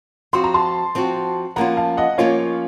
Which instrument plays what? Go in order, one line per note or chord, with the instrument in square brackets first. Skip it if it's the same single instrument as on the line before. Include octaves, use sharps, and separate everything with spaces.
[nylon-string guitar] F3 C4 F#4 [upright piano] C6
[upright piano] A#5
A5 C6
[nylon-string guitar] F3 C4 F#4
[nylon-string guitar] F3 A#3 C#4 F4 [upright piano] F#5 A#5
[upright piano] F5 A5
D#5 F#5
[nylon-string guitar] F3 A#3 C#4 F4 [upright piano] C#5 F5